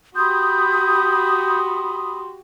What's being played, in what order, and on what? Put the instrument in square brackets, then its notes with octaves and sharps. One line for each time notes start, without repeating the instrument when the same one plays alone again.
[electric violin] F#4 G4 [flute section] B5 D#6 [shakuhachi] C6 [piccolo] G6